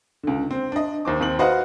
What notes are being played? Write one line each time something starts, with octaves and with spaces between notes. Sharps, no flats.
C#2 D3
C4
D4 D#5
D#2 C5 D6
D#2 C4 F#7
F#4 B4 C5 D#5 F5 F#5